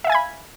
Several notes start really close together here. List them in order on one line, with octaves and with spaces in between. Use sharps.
E5 F5 G#5 G#6 B5